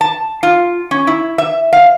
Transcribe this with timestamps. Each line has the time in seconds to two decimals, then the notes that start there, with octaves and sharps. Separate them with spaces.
0.01 A5
0.43 F4
0.91 C#4
1.07 E4
1.38 E5
1.73 F5